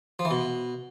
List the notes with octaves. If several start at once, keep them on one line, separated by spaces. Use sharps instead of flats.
F3
E3
B2